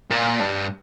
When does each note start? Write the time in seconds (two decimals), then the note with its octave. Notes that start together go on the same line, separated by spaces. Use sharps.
0.11 A#2
0.40 G2